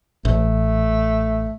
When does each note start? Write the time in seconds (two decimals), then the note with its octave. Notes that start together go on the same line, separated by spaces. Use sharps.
0.25 A1 A3